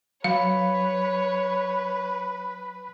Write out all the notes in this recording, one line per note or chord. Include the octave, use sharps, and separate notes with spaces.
F#3 B4 C#5 F5